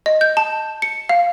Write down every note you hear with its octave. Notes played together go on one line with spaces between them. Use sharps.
D#5
G6
A5
C#7
F5